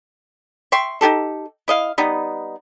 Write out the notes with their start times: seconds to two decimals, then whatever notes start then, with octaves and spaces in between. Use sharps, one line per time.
0.72 E5 G5 C6 C#6
1.01 D#4 F4 G4 A4
1.68 E4 D#5 F5
1.98 G3 B3 D#4